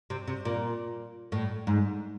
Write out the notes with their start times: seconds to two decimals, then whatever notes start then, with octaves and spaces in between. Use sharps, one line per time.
0.10 C3
0.28 C3
0.45 A#2
1.32 A2
1.67 G#2